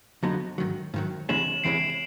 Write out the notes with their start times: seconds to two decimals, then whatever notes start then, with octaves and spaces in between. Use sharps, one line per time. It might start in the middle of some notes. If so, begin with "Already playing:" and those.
0.23 F2 D3 F#3 B3 D#4
0.58 G#2 D#3 F#3
0.94 G#2 D#3 F#3
1.29 E2 C3 E3 G#3 C#4 E7 F#7
1.64 E2 C3 E3 G#3 C#4 C7 D7
1.90 E7